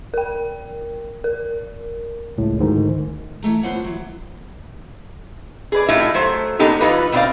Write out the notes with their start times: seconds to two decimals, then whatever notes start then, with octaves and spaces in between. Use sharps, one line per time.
0.14 A#4 G5
1.24 A#4
2.38 C#2 A2
2.58 D2 G#2 D#3
3.42 E3 A3 A#5
3.63 D3 B3 F4 C5 C#5 F#5
3.84 E3 F#3
5.72 G#4 B4 D5
5.89 A2 G3 D#4 F4 E5
6.14 F#3 A3 C5
6.59 D3 A#3 B3 D#4 G4 A4
6.81 D3 E3 G3 D#4 F4 B4
7.12 B2 B3 C4 D#4 D5 F5